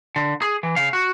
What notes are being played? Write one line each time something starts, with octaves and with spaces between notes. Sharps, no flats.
D3
G#4
E3
C#3 F5
F#4